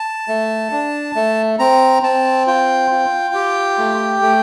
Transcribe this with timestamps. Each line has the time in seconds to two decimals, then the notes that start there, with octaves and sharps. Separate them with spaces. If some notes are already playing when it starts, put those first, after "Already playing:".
Already playing: A5
0.28 A3
0.71 D4
1.16 A3
1.59 C4 A#5
2.03 C4 A5
2.47 F4 G5
2.91 F4
3.35 G4
3.78 A3
4.22 A3